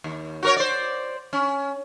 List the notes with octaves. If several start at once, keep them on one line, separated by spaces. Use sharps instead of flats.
D#2
F#4 A#4 C#5
C5 D5
C#4